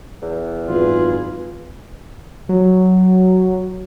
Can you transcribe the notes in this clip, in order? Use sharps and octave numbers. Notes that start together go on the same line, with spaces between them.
E2
G#1 F#2 F4 G#4 B4
F#3